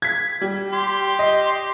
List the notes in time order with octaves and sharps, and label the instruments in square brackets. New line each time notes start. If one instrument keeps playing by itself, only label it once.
[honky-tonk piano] G#6 B6
G3
[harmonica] G4 C6
[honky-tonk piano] D#5